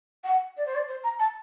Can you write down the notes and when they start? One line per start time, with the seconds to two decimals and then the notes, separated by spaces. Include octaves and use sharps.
0.24 F#5
0.57 D5
0.66 C5
0.75 D5
0.88 C5
1.04 A#5
1.19 A5